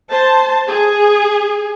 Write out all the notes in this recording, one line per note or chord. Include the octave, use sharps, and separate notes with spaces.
C5 A5
G#4